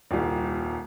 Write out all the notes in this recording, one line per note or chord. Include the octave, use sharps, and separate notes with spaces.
D#1 C2